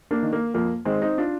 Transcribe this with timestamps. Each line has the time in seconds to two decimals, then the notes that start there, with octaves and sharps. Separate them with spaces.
0.11 A#3 D4
0.22 D#3
0.33 A#3
0.54 F2 A#3
0.85 D#3 G#3 C4
1.02 C4 D#4
1.18 D4 F4